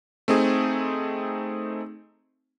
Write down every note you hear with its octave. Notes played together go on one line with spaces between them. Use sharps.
A3 C4 D#4 G#4